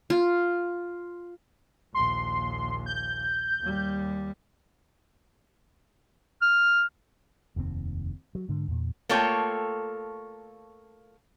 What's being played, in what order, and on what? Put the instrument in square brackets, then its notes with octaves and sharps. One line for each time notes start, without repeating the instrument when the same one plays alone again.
[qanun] F4
[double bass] A#1 D#2 [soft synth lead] C6
[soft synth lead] G6
[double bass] D#2 G3
[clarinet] F6
[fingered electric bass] F1 D#2 B2 C4
F#3
G#2 D3
E2 A#2
[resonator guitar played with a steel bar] A3 A#3 F4 A4 C#5 G5